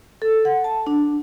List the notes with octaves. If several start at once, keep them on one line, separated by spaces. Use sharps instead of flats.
A4
F#5
A5
D4